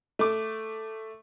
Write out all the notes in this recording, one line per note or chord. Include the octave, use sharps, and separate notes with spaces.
A3 D6